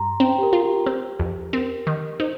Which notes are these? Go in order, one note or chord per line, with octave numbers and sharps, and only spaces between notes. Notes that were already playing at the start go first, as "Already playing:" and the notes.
Already playing: G2 A#5 C6
C4 G5
G4
A#4
F4
G4
C4
F2
C4 A#4
D#3
D#4 C5